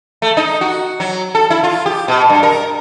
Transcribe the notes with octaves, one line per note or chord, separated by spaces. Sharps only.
A3
D#4
F#4
F#3
A4
E4
F4
G4
B2
G2
A#4